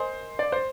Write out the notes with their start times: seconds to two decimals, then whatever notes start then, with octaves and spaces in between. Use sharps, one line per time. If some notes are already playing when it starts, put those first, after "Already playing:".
Already playing: A#4 C5 D#5 G#5 C6
0.39 D5
0.52 C5